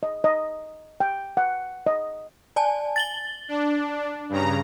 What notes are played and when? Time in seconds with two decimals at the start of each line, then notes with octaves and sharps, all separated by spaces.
0.03 D#5
0.24 D#5
1.00 G5
1.37 F#5
1.86 D#5
2.56 D5 G#5 A5
2.96 A6 F#7 G7
3.48 D4
4.29 G2 C#3 A#5